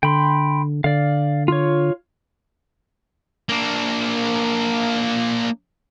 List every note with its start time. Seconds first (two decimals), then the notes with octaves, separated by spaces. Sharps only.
0.03 D3 G5 B5 C6
0.84 D3 D5 F5
1.48 F4 C#5
3.49 A#3 D4